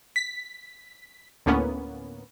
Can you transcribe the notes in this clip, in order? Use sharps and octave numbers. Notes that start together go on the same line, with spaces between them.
B6
D2 A2 A#3 B3 C#4